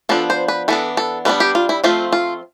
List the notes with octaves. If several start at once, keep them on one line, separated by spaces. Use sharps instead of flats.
F3 B3 D4 A4
C5
B4
E3 B3 D4 A4
A4
G3 B3 D4 B4
G4
F4
E4
F3 A3 C4 F4
F4